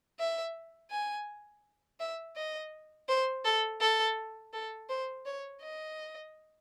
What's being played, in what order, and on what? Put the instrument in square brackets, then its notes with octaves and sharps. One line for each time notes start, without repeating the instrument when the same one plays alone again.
[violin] E5
G#5
E5
D#5
C5
A4
A4
A4
C5
C#5
D#5